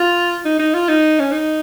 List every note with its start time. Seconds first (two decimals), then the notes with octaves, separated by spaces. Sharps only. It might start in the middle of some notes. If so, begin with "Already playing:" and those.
Already playing: F4
0.45 D#4
0.59 D#4
0.74 F4
0.88 D#4
1.19 C#4
1.31 D#4